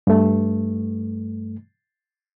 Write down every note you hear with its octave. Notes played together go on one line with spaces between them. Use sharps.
G2 A3